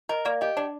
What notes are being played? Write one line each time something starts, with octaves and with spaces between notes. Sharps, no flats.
A#4 D#5
A#3 D5
G4 D#5
D4 D5